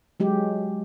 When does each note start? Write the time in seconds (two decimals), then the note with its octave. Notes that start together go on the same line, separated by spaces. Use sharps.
0.20 F#3 G#3 G4